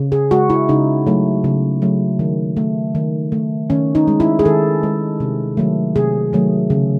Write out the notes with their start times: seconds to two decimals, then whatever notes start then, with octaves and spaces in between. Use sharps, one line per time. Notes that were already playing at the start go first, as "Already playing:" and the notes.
Already playing: C#3
0.12 G#4
0.31 G#3 F#4
0.50 E4
0.68 C#3 D#4
1.06 F#3 A3
1.44 C#3
1.82 F#3 A3
2.19 D#3
2.57 A3
2.95 D#3
3.32 A3
3.70 D#3 C#4
3.95 D#4
4.08 G#3
4.20 E4
4.39 G#4
4.45 D#3 A4
4.83 G#3
5.20 C3
5.57 D#3 F#3 A3
5.95 C3 G#4
6.33 D#3 F#3 A3
6.70 C#3